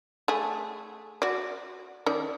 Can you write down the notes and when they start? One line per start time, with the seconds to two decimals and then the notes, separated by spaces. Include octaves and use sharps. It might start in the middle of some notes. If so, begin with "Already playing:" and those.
0.28 A3 G#4
1.22 F#4 D5
2.06 D#3 C#4 D5